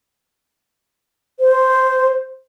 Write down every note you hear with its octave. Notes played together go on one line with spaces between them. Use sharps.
C5